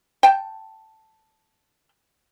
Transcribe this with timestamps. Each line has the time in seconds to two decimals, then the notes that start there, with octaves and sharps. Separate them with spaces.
0.23 G5 A5